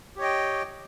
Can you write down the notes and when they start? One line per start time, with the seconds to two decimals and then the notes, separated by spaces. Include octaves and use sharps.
0.16 G4
0.19 C#5
0.21 D#5
0.24 G5